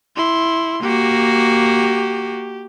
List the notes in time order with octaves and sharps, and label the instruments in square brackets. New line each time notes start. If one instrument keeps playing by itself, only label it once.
[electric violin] E4 C6
[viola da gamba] A#3 F#4 [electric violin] G4